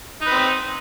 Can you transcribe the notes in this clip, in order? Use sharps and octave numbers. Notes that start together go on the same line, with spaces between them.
C4 D#4 B4